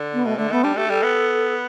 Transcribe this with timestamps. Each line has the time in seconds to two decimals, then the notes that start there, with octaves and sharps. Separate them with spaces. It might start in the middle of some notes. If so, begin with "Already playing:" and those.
Already playing: D3
0.14 B3
0.25 B2 A3
0.37 D3 A3
0.51 A3 B3
0.64 G3 D4
0.77 A3 G4
0.89 G3 A4
1.03 B3